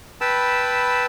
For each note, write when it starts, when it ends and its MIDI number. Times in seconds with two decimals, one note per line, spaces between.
0.21 1.06 71
0.21 1.06 79
0.21 1.06 81
0.21 1.06 83
0.21 1.06 88